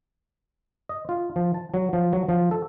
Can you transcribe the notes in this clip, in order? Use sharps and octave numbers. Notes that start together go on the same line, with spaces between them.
D#5
F4
F3
A5
F#3
F3
F#3
F3
A4